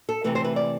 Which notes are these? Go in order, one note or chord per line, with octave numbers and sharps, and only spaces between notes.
A4
C3 E3 A3 B4
C5
B4
D5